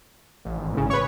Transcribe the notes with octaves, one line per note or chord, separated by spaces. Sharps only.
A1
G#1
A1 C#3
B4 C#5